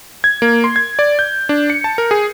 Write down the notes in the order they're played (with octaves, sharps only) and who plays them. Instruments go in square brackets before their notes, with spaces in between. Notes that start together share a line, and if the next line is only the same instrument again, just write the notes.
[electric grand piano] G#6
A#3
C6
G#6
D5
G6
D4
C#7
A5
A#4
G#4